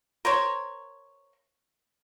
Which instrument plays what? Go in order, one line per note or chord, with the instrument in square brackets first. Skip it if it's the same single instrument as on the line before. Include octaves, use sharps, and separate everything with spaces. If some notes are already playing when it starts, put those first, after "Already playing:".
[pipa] A#4 C5 C#5